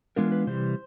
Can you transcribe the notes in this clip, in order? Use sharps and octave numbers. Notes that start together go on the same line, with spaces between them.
E3 G#3 B3 D4 F4 A#4
B4
C3 E3 G3 C5